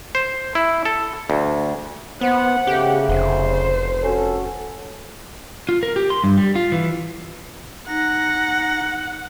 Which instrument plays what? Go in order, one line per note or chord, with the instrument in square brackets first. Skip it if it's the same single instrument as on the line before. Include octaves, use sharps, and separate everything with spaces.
[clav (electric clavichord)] C5
E4
A4
D2
[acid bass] B3 [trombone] C5 [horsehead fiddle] F#5
[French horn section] C#3 [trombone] A3 [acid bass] G4
[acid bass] F1 [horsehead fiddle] C5
[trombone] C#4 [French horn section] F#4 A4
[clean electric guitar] F4
A#4
G4
C6
G2
G3
F4
E3
[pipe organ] D#4 A#6 [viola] F#5